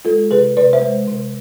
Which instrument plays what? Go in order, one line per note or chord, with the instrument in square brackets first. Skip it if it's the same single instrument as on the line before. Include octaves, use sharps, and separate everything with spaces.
[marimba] G#3 F4 A4
C3 G#4 B4
C3 B4 D5
C5 E5
G#3
C3